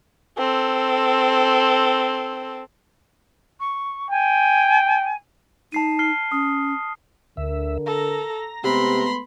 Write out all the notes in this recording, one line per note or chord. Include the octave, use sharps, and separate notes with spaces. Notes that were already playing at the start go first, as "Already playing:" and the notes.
C4 A4
C#6
G5 G#5
D#4 A5 C7 D#7
F6 C7 G7
C#4 D#6
D2 D3 A#4 E5
A4 A#5
C3 G#3 A3 B3 B5 C6